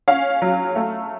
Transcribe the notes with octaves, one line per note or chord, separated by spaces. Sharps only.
C#4 F5
F#3
A3